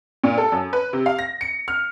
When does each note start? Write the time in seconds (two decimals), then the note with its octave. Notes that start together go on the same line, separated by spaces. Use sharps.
0.24 A#2
0.38 A4
0.52 F#2
0.73 B4
0.93 C3
1.06 F5
1.19 A#6
1.41 C#7
1.68 F6